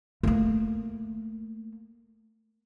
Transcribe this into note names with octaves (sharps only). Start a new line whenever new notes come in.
A3 A#3